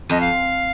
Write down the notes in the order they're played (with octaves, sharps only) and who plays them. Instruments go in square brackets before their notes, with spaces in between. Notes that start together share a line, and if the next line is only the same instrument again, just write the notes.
[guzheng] F2 [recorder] D#5
[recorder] F5